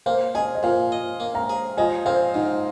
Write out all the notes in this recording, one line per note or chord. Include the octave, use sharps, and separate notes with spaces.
A#3 C5 F5
G#4 D#5 G#5
D#5
A#2 C5 F5
D#5
A#3
F5 A#5
G#4
F3 D#5 G#5
C4 C5 F5
G#2 D#4